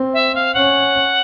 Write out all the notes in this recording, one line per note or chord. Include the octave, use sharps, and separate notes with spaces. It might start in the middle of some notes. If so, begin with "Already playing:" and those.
Already playing: C4
E5
F5
C#4 F#5